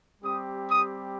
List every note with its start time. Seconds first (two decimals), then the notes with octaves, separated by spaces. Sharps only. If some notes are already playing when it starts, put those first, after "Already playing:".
0.22 G3 C4 G4 D#6
0.67 D#6